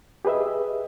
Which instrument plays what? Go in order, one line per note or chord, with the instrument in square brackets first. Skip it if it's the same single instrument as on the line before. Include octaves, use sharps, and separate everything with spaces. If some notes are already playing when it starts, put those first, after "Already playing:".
[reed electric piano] G4 G#4 B4 D#5 E5